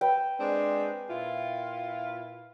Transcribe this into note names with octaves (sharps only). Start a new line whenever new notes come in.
B4 G5 E6
G#3 C4 D4
A#2 E4 F4